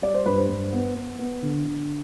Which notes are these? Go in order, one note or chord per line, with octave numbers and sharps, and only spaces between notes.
G3 D5
C5
G2 B4
C5
G2
B3
B3
B3
D3
D3